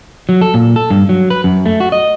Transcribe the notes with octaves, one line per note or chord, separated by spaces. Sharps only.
F#3
A4
A#2
A4
G2
F#3
B4
F#2
A3
F#4
D#5